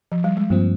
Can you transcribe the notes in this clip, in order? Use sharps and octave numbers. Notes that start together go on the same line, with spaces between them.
F3
G3
G#3
G2 F3 A#3 C4